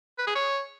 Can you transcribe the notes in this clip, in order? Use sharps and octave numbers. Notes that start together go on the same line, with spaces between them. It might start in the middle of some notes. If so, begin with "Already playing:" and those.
B4
G#4
C#5